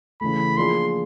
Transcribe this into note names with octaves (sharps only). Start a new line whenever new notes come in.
C#3 E3 A3 B5
F3 A#3 D4 F4 G#4 C6